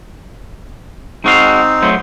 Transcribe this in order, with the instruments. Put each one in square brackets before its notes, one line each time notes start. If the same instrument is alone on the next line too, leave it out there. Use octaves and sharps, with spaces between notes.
[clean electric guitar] G#3 F#4 F5 [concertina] C4 D#4
[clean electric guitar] F#3 A3 C5